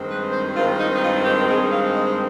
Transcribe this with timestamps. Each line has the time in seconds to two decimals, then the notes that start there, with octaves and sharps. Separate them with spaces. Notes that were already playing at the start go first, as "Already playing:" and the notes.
Already playing: G2 D#3 G#3 C4
0.08 B4
0.31 C5
0.55 G2 D#3 G#3 C4 F4
0.78 D#4
0.94 D#4
1.01 F4
1.24 G4
1.48 G2 D#3 G#3 C4 G#4
1.70 F5
1.94 D#5